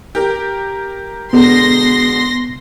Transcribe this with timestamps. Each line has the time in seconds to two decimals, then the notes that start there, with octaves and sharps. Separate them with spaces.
0.15 G4 A#4
1.33 B2 D3 G#3 B3 C6 A#6